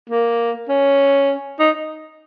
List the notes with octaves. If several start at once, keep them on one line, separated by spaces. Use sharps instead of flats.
A#3
C#4
D#4